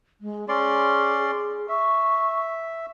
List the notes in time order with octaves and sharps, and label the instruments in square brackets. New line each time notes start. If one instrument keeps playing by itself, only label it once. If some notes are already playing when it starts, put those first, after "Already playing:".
[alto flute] G#3
[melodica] C#4 D5 C6 [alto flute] G#4
[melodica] E5 [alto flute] C#6